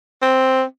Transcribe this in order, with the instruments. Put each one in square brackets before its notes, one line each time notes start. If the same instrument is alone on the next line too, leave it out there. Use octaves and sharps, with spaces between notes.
[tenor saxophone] C4